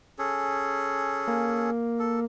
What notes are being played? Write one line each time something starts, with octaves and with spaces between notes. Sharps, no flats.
C#4 G#4 A4
A#3
A4